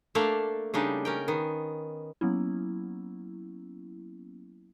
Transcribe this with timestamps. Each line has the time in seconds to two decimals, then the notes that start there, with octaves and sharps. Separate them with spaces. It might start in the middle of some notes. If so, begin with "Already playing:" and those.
0.15 A3 A#3 D4 A4 D5 F5
0.74 C#3 G3 D4 D#4
1.05 C#4 A#4 G5
1.28 D#3 B3
2.21 F#3 A#3 B3 C#4 E4